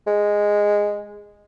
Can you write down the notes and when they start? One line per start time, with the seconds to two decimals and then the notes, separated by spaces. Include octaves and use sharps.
0.07 G#3